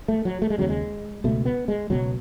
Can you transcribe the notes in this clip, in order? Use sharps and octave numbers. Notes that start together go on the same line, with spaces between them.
A3
F#3
A3
G#3
D#2 C#3 F#3
G#3
C#2 B2 A3
B3
G#3
C#2 B2 F#3